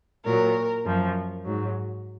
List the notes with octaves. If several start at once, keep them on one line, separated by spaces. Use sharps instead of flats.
A#2 F#3 A#4
F#2 F3
G#2 F#3